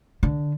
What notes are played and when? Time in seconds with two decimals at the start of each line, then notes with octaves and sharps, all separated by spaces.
0.23 D3